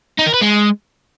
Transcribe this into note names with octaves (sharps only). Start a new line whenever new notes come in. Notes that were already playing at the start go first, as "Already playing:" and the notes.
D#4
A#4
B4
G#3